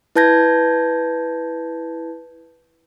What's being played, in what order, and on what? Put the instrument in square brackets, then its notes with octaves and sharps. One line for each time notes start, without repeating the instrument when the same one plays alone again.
[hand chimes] E4 B4 A5 G6 G#6 A#6